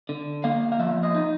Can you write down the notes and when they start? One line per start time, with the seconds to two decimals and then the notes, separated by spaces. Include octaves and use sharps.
0.09 D3
0.44 A#3 F5
0.72 F5
0.79 F3 E5
1.03 D#5
1.15 D#4